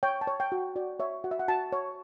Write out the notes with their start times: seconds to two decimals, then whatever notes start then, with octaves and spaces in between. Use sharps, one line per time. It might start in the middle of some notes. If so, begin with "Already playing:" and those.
0.03 C#5 G5
0.21 A5
0.27 C#5
0.40 G5
0.52 F#4
0.58 G5
0.76 F#4 D5
1.00 C#5 E5
1.24 F#4 F#5
1.31 E5
1.39 F#5
1.48 F#4 A5
1.72 C#5